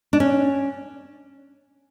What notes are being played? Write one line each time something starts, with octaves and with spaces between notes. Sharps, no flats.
D4
C#4